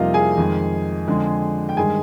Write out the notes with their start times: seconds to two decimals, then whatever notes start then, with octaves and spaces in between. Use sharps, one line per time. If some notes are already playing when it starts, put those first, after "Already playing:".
Already playing: F2 C3 G3 A#3 D#4 F4 D#5 F5
0.14 G#4 G#5
0.37 F2 D#3 G#3
1.08 F2 D3 G#3
1.69 G5
1.77 G2 D#3 G#3 G#4 G#5